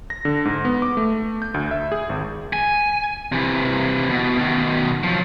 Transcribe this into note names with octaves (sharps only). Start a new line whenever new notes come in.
A#6
D3
G#2
B3
D6
A3
G6
D2
E5
G#4
G#1
G#5
C3 E3
B2
B2 D#3
F3 F#3